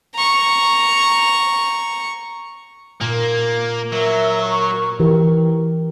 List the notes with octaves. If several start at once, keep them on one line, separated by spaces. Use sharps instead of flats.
A#5 C#6
A#2 A#3
F#3 A#4 E5
A#4 C#6
E3 G4 A#4